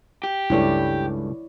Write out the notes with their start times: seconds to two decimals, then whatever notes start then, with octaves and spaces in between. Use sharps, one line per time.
0.24 G4
0.50 C#2 G2 A3 E4 C#5 D5